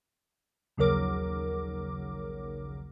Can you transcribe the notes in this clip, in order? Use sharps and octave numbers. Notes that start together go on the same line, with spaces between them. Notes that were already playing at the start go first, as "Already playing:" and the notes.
A#1 D#2 C#3 F#3 A#4 D6